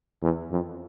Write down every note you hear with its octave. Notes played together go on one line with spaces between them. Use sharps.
E2
F2